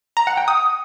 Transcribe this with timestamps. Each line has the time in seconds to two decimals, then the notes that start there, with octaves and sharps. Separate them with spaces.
0.17 A#5
0.27 F#5
0.37 G5
0.48 D#6